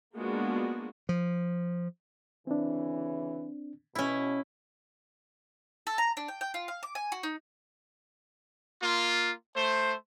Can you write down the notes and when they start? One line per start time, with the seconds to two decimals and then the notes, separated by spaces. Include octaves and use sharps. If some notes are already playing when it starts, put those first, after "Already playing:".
0.16 G#3 A#3 B3 D4 F4 F#4
1.09 F3
2.47 D2 C#3 E3 C4 D4
3.95 B2 C#4 E4
5.87 A4
5.98 A#5
6.17 D4
6.28 G5
6.41 G5
6.54 F4
6.68 F5
6.83 D6
6.95 G#5
7.12 F#4
7.23 D#4
8.81 A#3 F4
9.54 A3 C5